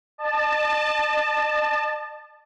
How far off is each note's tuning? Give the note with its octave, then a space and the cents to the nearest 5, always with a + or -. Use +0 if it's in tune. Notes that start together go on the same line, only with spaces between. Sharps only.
D#5 -45 A5 +0